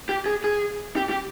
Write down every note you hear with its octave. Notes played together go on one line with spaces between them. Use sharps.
G4
G#4
G#4
G4
G4